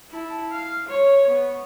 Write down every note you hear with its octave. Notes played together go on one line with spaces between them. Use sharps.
E4 A5
F5
C#5
B3